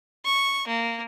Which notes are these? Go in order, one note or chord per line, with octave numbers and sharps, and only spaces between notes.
C#6
A#3